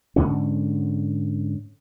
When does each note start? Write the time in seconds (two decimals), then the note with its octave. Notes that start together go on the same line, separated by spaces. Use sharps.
0.16 G#2 D3 C#4